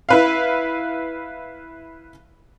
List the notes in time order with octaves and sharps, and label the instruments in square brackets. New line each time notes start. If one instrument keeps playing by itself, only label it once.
[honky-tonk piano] E4 B4 F5